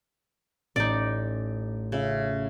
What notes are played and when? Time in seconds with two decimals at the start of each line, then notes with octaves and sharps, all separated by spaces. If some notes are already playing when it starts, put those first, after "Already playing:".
0.76 A1 D#4 D5
1.92 C#3 C#4 F4 E5